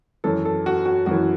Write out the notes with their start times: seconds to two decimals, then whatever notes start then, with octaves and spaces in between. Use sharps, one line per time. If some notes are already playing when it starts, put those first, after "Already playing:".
0.24 F#2 E3 A4
0.45 A4
0.66 F#4
0.86 F#4
1.06 F#2 E3 F#4